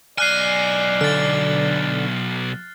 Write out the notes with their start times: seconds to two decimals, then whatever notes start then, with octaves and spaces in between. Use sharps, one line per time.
0.18 B1 D5 G#5 F6 F#6 C7
1.01 D3 F6 A6